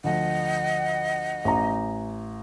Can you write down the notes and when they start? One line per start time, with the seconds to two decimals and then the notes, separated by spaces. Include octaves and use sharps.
0.04 D2 F3 D#5 F#5
1.45 A1 A#5